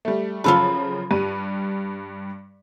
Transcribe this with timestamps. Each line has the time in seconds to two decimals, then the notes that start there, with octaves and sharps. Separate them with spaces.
0.05 G3 A3
0.44 F#2 C#3 F3 F4 A4 B4
1.11 G2 G3 D#7